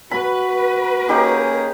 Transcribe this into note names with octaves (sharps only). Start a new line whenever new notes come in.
F#4 B4 B5
A#3 C#4 D#4 G4 G#4